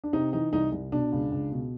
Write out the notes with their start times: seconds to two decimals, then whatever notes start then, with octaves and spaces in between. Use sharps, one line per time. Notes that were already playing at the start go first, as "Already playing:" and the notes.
0.04 D4
0.13 C3 D#4
0.33 E3 D#4
0.53 C2 D#4
0.72 C2
0.92 B2 D4
1.12 C#2
1.32 C#2
1.52 B2